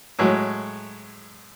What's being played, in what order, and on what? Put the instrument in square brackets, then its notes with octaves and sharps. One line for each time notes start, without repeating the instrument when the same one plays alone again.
[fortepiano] A2 F#3 G#3